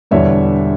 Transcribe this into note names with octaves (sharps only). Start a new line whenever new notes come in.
E1 E2 D3 G3 D4 C#5 E5